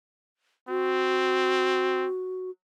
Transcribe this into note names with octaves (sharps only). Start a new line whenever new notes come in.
C4 F#4